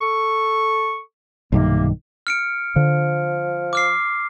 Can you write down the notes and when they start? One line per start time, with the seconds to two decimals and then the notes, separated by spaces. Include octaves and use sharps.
0.01 A4 C#6
1.52 B1 G2 C3 D#3 A#3
2.27 F6 C#7 D7
2.76 D3 F3
3.73 D6 F6 C7